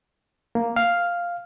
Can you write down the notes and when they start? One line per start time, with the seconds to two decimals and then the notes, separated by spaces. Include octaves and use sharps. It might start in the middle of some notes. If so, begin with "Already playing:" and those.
0.55 A#3
0.76 F5